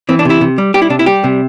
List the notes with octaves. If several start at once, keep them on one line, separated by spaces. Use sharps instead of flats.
E3 C4
D4
C3 E4
C3
G3
G3 G4
E4
C3 D4
E4
G3 G4
C3